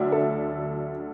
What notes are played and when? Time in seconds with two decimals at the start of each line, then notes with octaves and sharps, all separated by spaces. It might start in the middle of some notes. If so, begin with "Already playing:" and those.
Already playing: D2 D3 F#3 D5 E5
0.12 A4